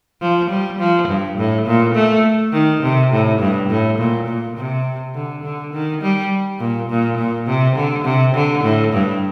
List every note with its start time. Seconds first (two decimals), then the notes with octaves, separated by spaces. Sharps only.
0.22 F3
0.50 G3
0.79 F3
1.08 G2
1.38 A2
1.66 A#2
1.95 A3
2.53 D#3
2.83 C3
3.12 A2
3.40 G2
3.70 A2
3.98 A#2
4.27 A#2
4.57 C3
5.14 D3
5.44 D3
5.73 D#3
6.02 G3
6.60 A#2
6.89 A#2
7.18 A#2
7.47 C3
7.75 D3
8.04 C3
8.35 D3
8.64 A2
8.93 G2